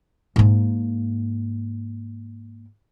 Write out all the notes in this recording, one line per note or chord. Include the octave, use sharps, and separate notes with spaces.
G#2 A#3